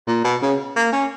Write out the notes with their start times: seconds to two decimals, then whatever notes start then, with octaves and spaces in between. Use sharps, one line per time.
0.07 A#2
0.24 B2
0.42 C#3
0.76 A#3
0.93 C#4